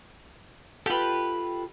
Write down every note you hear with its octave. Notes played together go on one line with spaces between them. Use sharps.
F4 G4 A4 B4